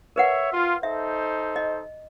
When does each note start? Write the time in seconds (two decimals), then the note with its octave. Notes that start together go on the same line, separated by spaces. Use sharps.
0.16 A#4 B4 C#5 E5 F#5
0.53 F4
0.83 D#4 A4 C5 E5
1.56 D#5